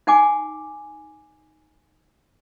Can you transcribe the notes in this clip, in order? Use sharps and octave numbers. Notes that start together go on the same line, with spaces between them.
D#4 F#5 G#5 D6